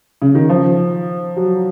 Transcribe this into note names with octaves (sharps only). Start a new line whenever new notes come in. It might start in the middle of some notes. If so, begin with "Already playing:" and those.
C#3
D#3
F3
F#3